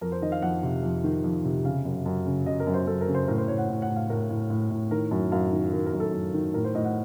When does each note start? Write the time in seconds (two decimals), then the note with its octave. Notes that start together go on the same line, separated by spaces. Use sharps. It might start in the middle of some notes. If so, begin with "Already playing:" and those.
0.01 F2 A#4
0.12 C5
0.22 D#3 D#5
0.32 F5
0.42 F2 F#5
0.63 C3
0.83 F2
1.04 D#3
1.24 F2
1.44 C3
1.65 C#3 F5
1.85 F#2
2.06 F#2
2.26 C#3
2.46 C#3 D#5
2.60 A#4
2.67 F#2
2.74 C5
2.87 F#2 A4
3.01 A#4
3.08 C#3
3.15 C5
3.28 A2 A#4
3.38 C5
3.48 A2 C#5
3.58 F#5
3.69 A2
3.82 F#5
3.89 A2
3.96 F5
4.09 A2 A#4
4.30 A2
4.50 A2
4.71 A2
4.91 D#3 A#4
5.11 F#2
5.32 F#2 F5
5.52 D#3
5.72 D#3 A#4
5.86 A#4
5.93 F#2
6.00 A4
6.13 F#2
6.34 D#3
6.54 A2 A#4
6.64 C5
6.75 A2 D#5
6.85 F#5